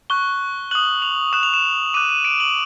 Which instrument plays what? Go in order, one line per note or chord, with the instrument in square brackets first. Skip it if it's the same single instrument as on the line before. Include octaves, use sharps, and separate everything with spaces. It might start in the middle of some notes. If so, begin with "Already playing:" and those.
[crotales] C#6 F#6 G7
D#6 F#6 F#7
F7
D#6 F#6 E7
F7
E7
D6 F#6 D#7
D#7
D7
F#7